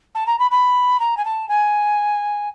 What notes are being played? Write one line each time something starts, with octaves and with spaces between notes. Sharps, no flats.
A5
A#5
B5
B5
A#5
G#5
A5
G#5